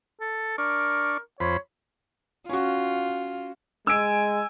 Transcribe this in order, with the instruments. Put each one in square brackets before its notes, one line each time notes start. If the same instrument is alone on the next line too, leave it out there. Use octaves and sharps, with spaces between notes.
[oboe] A4
[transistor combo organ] D4 C#6 [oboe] A#4
[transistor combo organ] F2 C5 B5 [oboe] C#5
[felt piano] C#4 F#4 [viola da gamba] F4
[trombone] G#3 [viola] G#5 [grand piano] E6 D7